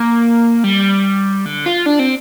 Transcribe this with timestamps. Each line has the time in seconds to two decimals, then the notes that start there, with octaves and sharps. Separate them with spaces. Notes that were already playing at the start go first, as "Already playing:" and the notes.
Already playing: A#3
0.64 G3
1.46 D3
1.66 F4
1.86 D4
2.00 C4